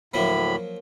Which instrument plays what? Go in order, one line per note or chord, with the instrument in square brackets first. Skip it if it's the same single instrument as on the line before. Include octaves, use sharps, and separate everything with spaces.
[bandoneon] D2 A2 B5 [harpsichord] F3 F#3 A#3